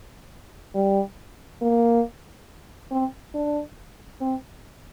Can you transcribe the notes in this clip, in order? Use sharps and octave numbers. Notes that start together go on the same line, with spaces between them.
G3
A#3
C4
D4
C4